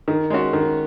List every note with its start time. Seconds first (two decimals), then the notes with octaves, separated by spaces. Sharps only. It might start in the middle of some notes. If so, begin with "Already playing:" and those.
0.08 D#3
0.30 G#3 C#4 F#4
0.53 D#3